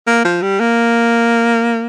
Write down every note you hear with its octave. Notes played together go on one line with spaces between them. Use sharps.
A#3
F3
G3
A#3